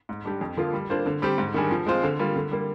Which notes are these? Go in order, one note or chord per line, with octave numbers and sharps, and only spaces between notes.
G#2
G3 D4 G4
F2
D3 F3 A#3 F4
G3
A#3 D4 F4 C5
D3
G3 C4 G4
G#2
D#3 G3 D4 G#4
F3
G#3 C4 F4 C5
D3
G3 A#3 F4
D3
G3 A#3